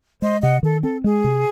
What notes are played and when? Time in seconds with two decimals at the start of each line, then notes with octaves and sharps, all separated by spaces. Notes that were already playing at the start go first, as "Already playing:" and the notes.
0.22 G#3 C5 D#5
0.42 C3 D#5 F#5
0.63 D#3 A4
0.83 C4 A4
1.04 G#3 G#4
1.24 C3